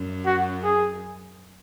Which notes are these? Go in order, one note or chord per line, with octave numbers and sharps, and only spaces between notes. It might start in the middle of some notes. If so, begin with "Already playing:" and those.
Already playing: F#2
F#4
G#4